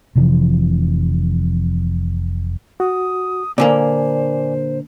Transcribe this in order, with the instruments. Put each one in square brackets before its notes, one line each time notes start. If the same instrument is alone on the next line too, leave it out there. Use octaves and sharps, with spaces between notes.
[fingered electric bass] F1 C3 E3 F3
[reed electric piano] F#4 [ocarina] D#6
[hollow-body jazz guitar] A#2 D3 A#3 [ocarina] C5 [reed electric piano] D5 G#5